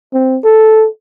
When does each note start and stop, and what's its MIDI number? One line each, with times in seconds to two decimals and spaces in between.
0.13 0.38 60
0.44 0.86 69